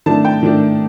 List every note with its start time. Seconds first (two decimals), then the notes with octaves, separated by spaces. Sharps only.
0.06 D#3 A3 D4 A5
0.25 G5
0.43 D#3 A3 D4